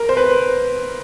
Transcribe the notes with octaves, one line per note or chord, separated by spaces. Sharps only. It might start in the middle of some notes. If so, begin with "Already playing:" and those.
Already playing: A#4
C5
B4